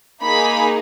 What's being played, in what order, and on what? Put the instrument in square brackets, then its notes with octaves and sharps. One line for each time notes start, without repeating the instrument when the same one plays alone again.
[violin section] A#3 D#4 G#4 B5